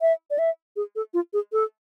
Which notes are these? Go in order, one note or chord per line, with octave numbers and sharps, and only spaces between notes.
E5
D5
E5
G#4
A4
F4
G#4
A4